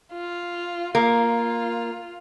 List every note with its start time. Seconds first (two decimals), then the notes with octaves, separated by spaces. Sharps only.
0.12 F4
0.95 A#3 F4